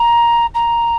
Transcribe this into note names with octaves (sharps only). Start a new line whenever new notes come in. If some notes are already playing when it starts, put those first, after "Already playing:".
Already playing: A#5
A#5